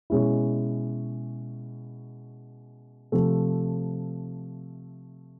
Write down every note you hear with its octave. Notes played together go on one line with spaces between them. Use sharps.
B2 G#3 C#4 E4
C3 F3 A3